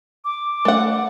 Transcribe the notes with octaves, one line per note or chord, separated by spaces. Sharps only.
D6
A3 F#5